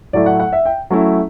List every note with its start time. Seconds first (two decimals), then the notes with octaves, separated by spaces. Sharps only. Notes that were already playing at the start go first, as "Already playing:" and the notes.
0.13 A2 F#3 A3 E4 D5
0.26 F#5
0.40 F#5
0.53 E5
0.65 G5
0.90 F#3 A3 C#4 E4